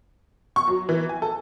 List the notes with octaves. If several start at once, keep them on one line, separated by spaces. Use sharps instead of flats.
C#6
F#3
E3
G#5
A4